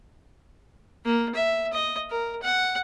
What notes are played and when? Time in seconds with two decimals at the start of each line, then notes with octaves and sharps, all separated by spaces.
1.04 A#3
1.34 E5
1.72 D#5
2.10 A#4
2.42 F#5